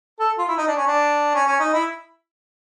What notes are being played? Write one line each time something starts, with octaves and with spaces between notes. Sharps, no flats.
A4
F4
E4
D#4
D4
C#4
D4
C#4
C#4
D#4
E4